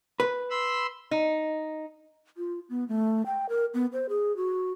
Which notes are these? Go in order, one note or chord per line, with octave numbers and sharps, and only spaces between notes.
B4
B5 C6 E6
D#4
F4
B3
A3
G5
A#4
B3
C5
G#4
F#4